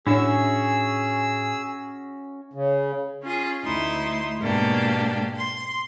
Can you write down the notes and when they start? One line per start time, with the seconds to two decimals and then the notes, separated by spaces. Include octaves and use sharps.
0.07 A2 C#4 D4 F#4 G#4 C#5 E5 E6
2.53 C#3
3.22 C#4 F4 G#4
3.64 D2 A3 D#4 E4 C6
4.40 G#2 B2 G#3 A#3 D4 G4
5.36 C6